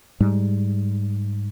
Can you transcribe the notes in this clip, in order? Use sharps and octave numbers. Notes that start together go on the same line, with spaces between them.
G#2 G3